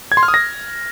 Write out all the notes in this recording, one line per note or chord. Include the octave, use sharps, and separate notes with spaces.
G#6
C6
F6
D#6
A#6